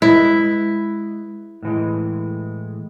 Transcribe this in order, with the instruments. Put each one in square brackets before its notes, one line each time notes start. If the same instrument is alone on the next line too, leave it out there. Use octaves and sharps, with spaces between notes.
[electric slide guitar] G#3 B4 D#5 [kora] E4
[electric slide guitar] A2 E3 G#3